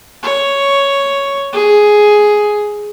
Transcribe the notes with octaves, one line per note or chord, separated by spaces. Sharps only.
C#5
G#4